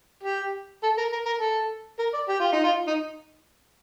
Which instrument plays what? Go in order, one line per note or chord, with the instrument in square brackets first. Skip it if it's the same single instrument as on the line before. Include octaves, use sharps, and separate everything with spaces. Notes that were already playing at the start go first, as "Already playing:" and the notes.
[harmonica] G4
A4
A#4
A#4
A#4
A4
A#4
D5
G4
F4
D#4
F4
D#4